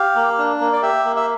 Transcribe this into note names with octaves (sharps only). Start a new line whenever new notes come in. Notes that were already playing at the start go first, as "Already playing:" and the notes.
Already playing: G4 F5
A#3
D4
A#3
D5
G4 E5
A#3
E5